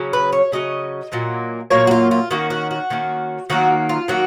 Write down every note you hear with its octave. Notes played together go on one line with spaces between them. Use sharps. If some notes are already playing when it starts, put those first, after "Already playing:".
Already playing: C#3 F#3 C#4
B4
C#5
C#3 F#3 C#4 D#5
A#2 F#3 A#3
A#2 F#3 A#3 C#5
F#4
F4
F4
D#3 A#3 C#4 F#4
F#4
F#4
D#3 A#3 C#4
D#3 F#3 A#3 F#4
F4
D#3 F#3 A#3 F#4